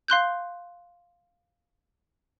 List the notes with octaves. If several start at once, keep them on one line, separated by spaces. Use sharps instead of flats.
F5 C6 F#6 G6